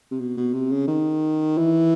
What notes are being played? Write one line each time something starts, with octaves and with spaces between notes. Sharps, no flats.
C3
B2
B2
C3
C#3
D#3
E3